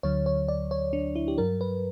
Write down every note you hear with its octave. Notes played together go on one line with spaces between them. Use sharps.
D2 D3 F#3 C#5
C#5
D5
C#5
D4
E4
G4
G2 F#3 A#4
B4